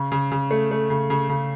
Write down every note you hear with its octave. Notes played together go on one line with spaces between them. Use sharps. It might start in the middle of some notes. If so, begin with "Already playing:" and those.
Already playing: C#3
C#3
C#3
A3
A3
C#3
C#3
C#3